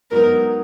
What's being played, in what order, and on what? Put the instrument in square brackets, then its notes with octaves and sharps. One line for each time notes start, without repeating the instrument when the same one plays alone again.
[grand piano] G#2 F#3 B3 D#4 [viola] A#4